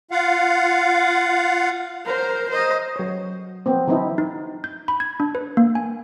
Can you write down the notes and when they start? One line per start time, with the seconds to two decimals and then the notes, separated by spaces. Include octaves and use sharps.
0.11 F4 F5 F#5
2.05 A#4 C5
2.49 C5 D#5
2.96 F#3 C#5
3.66 F3 B3 C4
3.87 D3 E3 F#3 C4 D#4 E4
4.18 D#4
4.64 G6
4.88 B5
5.00 G#6
5.20 D4
5.35 B4
5.57 A#3
5.75 G#5